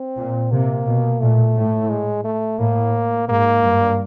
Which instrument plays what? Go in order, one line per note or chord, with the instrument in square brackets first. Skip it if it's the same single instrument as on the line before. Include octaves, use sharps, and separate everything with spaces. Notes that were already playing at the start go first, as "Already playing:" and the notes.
Already playing: [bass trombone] C4
[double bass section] A#2
[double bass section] C3 [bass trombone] A#3
[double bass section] B2
[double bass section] A#2 [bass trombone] A3
[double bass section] A2
[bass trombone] G#3
A3
[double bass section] A2 [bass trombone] A#3
[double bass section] G#2 [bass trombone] A#3
[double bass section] G2